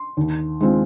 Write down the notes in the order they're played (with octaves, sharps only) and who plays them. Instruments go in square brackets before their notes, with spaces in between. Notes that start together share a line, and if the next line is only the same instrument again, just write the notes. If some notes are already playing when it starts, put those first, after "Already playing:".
Already playing: [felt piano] C6
D#2
D#3 G#3 C4 F4